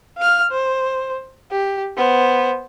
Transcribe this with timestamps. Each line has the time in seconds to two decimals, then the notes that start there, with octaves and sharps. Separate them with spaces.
0.17 F5 F6
0.51 C5
1.51 G4
1.97 B3 C5